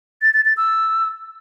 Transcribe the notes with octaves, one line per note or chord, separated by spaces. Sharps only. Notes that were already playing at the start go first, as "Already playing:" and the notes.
A6
A6
A6
E6